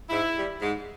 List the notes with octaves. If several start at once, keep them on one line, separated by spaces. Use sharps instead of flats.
G#2 E4
G3
G#2